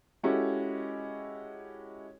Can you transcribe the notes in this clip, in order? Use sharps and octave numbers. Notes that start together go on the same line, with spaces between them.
G#3 C#4 E4 F#4 G4 A4